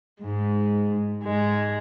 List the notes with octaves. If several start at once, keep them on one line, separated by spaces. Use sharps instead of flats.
G#2 G#3
G#2 G#3